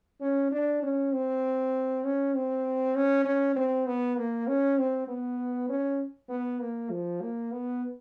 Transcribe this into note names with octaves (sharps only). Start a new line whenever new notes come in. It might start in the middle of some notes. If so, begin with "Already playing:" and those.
C#4
D4
C#4
C4
C#4
C4
C#4
C#4
C4
B3
A#3
C#4
C4
B3
C#4
B3
A#3
F3
A#3
B3